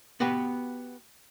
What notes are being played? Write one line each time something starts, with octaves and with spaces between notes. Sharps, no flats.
B3 F#4 G4 B4